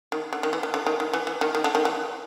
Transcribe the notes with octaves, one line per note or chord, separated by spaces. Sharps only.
D#3
D3
D#3
E3
D#3
D3
D#3
D#3
E3
E3
D#3
D#3
D3
D#3
E3